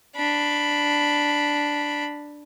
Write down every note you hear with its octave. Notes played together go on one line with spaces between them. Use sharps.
D4 B5